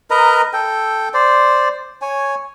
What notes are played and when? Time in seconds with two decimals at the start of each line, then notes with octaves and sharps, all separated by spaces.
0.10 A#4 B4 D#5 A#5
0.53 A4 G5
1.14 C5 D5
2.02 C#5 G#5